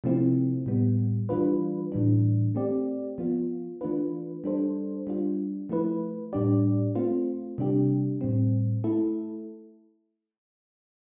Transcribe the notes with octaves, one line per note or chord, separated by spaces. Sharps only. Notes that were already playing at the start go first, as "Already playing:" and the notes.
C3 F3 A3 C4 E4
A2 G3 B3
E3 G3 D4 F4 B4
A2 E3 G3 D4
A3 C4 G4 D5
F3 B3 F4
E3 A3 D4 F4 B4
G3 D4 A4 C5
G3 D4 F4
F3 A3 E4 B4
A2 G3 D4 G4 D5
A3 C4 F4
C3 G3 D4 G4
A2 G3 C4
A3 E4 A4